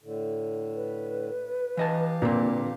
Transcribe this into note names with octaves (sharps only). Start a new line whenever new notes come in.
A2 D3
B4
E3 G4 D#5 F5 A5
A#2 D3 A#3 C4